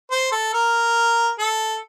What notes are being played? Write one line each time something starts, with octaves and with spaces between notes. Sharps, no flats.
C5
A4
A#4
A4